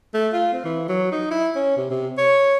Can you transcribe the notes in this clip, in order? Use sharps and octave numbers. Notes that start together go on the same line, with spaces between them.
A3
F4
C4
E3
F#3
D#4
E4
C#4
C3
C3
C#5